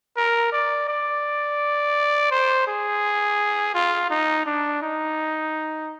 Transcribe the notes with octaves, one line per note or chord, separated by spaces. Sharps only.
A#4
D5
D5
C5
G#4
F4
D#4
D4
D#4